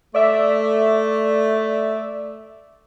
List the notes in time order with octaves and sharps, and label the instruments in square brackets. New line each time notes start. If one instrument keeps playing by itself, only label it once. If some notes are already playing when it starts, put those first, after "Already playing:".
[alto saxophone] A3 [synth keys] D5 E5